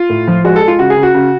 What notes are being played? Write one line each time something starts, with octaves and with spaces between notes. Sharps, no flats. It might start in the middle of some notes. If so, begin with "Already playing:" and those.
Already playing: F4
A2
F3
G#3 F#4
A4
G#3
F4
C#3 F#4
G#4
C#3
F#4
C#3